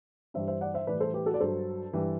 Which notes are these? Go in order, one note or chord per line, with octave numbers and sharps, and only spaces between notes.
G2 E3 G3 C5 E5
C5 E5
D5 F#5
C5 E5
A2 E3 G3 B4 D5
A4 C5
G4 B4
F#4 A4
D5
G2 F#3 A4 C5
G2 E3 G3